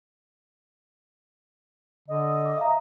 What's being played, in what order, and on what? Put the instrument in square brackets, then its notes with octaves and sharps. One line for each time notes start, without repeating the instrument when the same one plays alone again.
[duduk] D3 [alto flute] D#5
[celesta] D6
E5 F5 A#5